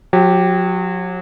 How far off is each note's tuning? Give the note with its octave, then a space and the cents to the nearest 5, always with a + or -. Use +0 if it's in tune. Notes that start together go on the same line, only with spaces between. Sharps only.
F#3 -35 G4 -5